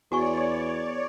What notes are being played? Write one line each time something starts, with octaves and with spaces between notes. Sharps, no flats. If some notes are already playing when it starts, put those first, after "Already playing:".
E2 F#4 C#5 D5 G#5 C#6